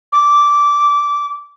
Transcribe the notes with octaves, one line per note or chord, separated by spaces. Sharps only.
D6